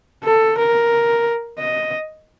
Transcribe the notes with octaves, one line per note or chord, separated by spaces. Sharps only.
A4
A#4
D#5